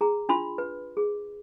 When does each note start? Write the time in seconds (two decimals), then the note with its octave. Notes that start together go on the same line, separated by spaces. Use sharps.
0.01 G#4 A#5
0.29 D4 F4 B5 C6
0.58 B4
0.97 G#4